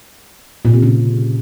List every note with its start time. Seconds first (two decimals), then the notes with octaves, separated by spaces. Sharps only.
0.65 A#2
0.74 C3
0.82 C#3